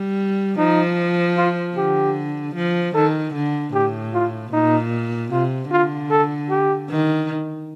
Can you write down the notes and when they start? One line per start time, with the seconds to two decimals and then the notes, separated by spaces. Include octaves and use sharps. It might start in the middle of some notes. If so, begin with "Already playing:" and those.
Already playing: G3
0.58 F3 D#4
1.37 F4
1.77 D3 G4
2.55 F3
2.95 D#3 A4
3.34 D3
3.74 A2 G4
4.14 F4
4.53 A#2 D#4
5.32 C3 F4
5.72 D3 F4
6.11 A4
6.50 G4
6.90 D#3